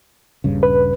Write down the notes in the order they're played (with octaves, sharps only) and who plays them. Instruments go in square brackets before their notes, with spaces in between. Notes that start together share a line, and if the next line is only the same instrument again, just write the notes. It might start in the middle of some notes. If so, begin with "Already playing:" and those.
[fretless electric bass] D#1 G2 C#3
[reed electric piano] B4